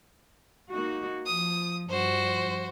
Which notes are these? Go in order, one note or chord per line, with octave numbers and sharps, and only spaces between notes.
A#3 D#4 F#4
F3 D#6
G2 F3 F#4 C5